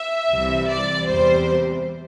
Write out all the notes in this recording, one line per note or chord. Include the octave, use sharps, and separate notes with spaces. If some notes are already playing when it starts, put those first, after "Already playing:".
Already playing: E5
C2 C3 E3 G3
D5
E2 C3 G3 C5